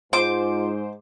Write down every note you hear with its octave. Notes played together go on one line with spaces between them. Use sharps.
G#2 F4 C5 D6